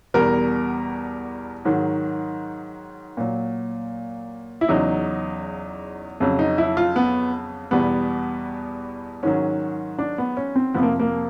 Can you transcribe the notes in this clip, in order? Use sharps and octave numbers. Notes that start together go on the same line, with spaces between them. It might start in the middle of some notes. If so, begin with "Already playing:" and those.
E2 B2 G3 A#4
G#2 D#3 F#3
A#2 F#3
E4
E2 C#3 F#3 D#4
F2 C#3 F#3
D#4
E4
F4
B3
E2 B2 G3 B3
G#2 D#3 F#3 C#4
D4
B3
C#4
C4
F2 C3 F3 B3
A#3
A#3